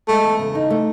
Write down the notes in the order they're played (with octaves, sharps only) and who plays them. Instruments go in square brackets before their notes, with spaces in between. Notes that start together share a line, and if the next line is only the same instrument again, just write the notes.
[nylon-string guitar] G#3 [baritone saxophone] A3
[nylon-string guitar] E2
C#3
D#4
A3